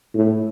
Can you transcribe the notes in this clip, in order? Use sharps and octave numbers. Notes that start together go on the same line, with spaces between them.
A2